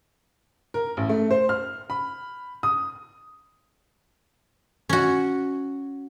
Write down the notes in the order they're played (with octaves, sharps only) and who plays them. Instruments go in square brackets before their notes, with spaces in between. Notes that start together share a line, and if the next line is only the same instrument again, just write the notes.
[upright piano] A#4
A1
A3
C5
F6
B5
D#6
[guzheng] C#4 F#4